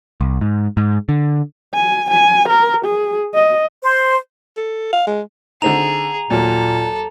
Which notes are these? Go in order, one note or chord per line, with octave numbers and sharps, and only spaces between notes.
C2
G#2
G#2
D3
G#5
G#5
A#4
G#4
D#5
C5
A4
F5
G#3
D3 C4 D#4 G#4 A#5 F7
D#2 A#2 F#3 A4